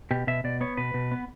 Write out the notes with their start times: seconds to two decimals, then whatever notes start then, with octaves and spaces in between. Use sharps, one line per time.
0.11 B2 G4
0.27 B2 E5
0.44 B2 D5
0.61 B3 C#5
0.77 B2 B4
0.94 B2
1.12 B3